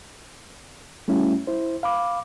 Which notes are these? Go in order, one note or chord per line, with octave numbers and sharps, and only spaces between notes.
G3 A3 C#4 E4 F#4
E4 C5
F5 B5 D6